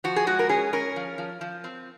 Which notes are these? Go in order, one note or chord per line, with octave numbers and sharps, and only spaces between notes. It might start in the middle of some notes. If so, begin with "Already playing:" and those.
F3 F#4
G#4
G#3 F#4
A#4
C#4 G#4
C#4 A#4
F3
F3
F3
C4